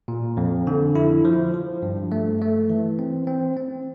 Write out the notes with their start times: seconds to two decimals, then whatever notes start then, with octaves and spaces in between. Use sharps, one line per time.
0.08 A#2
0.37 F2
0.67 D3
0.95 E4
1.25 F3
1.54 F3
1.82 G2
2.12 A3
2.41 A3
2.70 E3
2.99 C4
3.27 C4
3.57 C4